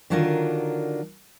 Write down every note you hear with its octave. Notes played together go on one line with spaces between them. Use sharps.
D3 D#3 F#3 D4 F4 A#4